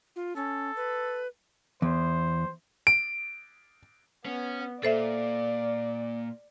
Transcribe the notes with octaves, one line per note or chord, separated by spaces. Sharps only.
F4
C#4 A4
B4
E2 C5
D7
B3 C#4
A#2 A4 C5 D5 E5